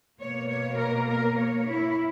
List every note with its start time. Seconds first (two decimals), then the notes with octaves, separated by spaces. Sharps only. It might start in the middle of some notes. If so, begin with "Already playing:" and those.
0.18 B2 A#3 C#5
0.48 C#5
0.78 A#4
1.07 A#4
1.37 C#5
1.66 E4